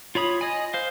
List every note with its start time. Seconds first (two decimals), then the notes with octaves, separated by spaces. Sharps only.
0.15 F4 C#5 B5 D#6
0.41 D#5 G#5
0.74 C5 F5